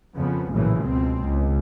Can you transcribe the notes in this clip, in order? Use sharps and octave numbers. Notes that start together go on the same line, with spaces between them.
F2 C#3 F3 B3
A#1 F#2 A2 C#3 E3
C#2 B2 C4
C#2